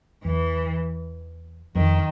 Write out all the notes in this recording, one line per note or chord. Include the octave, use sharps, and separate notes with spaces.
E2 E3
F2 D#3